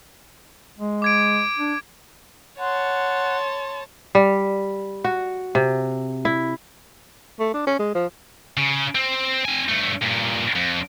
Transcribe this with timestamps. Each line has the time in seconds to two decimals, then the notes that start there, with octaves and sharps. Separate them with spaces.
0.78 G#3
1.02 D6 G#6 D7
1.57 D4
2.59 C#5 F#5 A5 C6
4.15 G3
5.04 F#4
5.55 C3
6.25 E4
7.39 A3
7.53 D4
7.66 C#4
7.79 G#3
7.95 F3
8.57 C#3
8.95 C4
9.45 C4 G#5
9.69 G2 A3
10.02 G2 A#2
10.56 F2